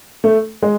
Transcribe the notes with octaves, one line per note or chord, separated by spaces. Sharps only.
A3
G#3